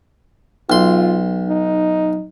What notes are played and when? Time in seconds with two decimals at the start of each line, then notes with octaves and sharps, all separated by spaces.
0.70 B1 F4 C6
1.49 D#4